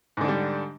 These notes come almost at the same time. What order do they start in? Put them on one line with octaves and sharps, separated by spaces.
G#2 D3 D4 G3